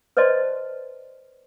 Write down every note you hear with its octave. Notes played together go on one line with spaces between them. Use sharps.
B4 C5 D5 D#5 A5 C6